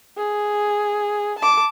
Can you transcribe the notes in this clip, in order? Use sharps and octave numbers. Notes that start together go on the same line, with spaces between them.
G#4
A5 D6